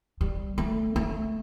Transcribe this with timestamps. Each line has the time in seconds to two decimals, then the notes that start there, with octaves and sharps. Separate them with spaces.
0.21 G3
0.58 A3
0.96 A3